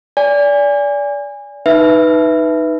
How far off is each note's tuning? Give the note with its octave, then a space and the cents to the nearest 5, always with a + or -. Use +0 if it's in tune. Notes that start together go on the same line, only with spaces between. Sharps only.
D5 -25 G#5 -20
D#4 +0 B4 +0 E5 +0